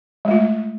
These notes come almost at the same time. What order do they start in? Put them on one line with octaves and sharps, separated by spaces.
G#3 A3 F4